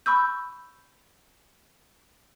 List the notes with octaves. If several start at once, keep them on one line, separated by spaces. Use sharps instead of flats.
B5 C#6 E6 G6